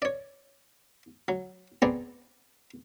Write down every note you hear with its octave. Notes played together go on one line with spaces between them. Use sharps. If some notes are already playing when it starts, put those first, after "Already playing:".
C#5 D5
F#3
B3 C4 G#4 D5 A#5